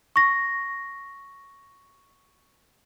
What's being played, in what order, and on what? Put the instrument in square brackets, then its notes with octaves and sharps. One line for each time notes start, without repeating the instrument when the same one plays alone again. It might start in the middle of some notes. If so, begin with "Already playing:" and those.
[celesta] C#6 A#6